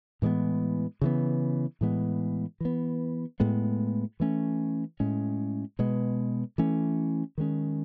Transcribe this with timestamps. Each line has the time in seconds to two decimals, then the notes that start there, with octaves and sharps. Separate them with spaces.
0.22 A2 E3 G#3 B3
1.01 C#3 E3 B3
1.81 A2 E3 G#3 B3
2.60 E3 B3
3.40 A2 G#3 B3
4.20 E3 A3 C#4
5.00 A2 G#3 C#4
5.79 B2 G#3 B3
6.58 E3 A3 C#4
7.38 D#3 G#3 C#4